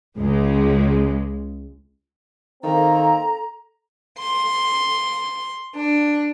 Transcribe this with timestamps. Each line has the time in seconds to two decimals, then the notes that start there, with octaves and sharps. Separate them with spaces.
0.18 C#2 G#3
2.63 D#3 A#3 C4 A4 A#5
4.18 C6
5.75 D4